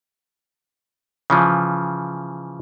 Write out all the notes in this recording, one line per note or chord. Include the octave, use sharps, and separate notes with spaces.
C#3 E3 F3